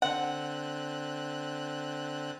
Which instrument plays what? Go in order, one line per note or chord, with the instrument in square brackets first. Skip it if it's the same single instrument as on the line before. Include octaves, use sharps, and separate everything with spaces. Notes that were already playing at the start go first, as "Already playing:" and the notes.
[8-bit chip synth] D3 C4 F#6 [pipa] F#5